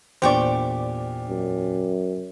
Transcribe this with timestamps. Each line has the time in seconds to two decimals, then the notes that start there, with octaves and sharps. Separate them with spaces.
0.22 E2 A#2 D4 G4 C5 D5 G5 C#6
1.28 F#2